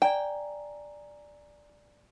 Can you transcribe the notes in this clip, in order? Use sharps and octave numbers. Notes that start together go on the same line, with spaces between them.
D5 G5 G#5 A#5